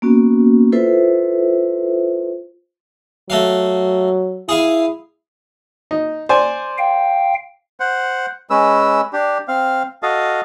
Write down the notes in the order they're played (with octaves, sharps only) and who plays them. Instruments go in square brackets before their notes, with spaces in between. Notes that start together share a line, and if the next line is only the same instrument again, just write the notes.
[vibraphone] A#3 B3 C#4 F#4
E4 F4 A4 B4 C5 E5
[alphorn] F#3 [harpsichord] A3 F#4 F5
[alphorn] E4 [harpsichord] G#4 F5 G#5
[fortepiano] D#4
C5 D5 G#5
[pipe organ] F5 G5
[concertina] C5 F#5
G#3 C#4 B4 E6
D4 G4
C4 F5
F#4 A4 D#5 F5